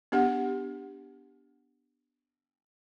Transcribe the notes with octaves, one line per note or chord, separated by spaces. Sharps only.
B3 D4 G4 F#5